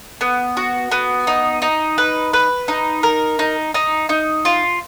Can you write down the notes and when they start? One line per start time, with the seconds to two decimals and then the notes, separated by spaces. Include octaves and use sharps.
0.21 B3
0.57 F#4
0.91 B3
1.27 D#4
1.62 D#4
1.98 B4
2.33 B4
2.68 D#4
3.03 A#4
3.39 D#4
3.74 D#4
4.09 D#4
4.45 F4